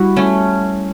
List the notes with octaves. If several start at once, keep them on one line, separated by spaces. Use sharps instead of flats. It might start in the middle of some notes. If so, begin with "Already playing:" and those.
Already playing: G3 E4 F#4
A3 C#4